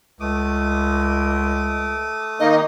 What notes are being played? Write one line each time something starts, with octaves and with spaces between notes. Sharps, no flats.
C#2 A3 D6 D#6
D#3 A#3 D#4 D#5